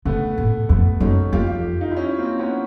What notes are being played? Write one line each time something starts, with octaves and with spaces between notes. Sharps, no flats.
D3 A3 B3
A2
F2 A3 B3
F#2 C#4 D#4
F2 F4 G4
F4 G4
D#4 F4
E4
C#4 D#4
A#3 C4
B3 C#4